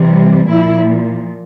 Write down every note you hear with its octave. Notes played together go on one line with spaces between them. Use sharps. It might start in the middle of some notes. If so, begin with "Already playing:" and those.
Already playing: C3 E3 G3
A#2 F3 E4